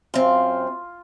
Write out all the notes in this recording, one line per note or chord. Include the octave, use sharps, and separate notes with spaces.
F#2 C4 F4